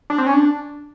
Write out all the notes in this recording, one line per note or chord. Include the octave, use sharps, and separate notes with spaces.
D4
C4
C#4
D4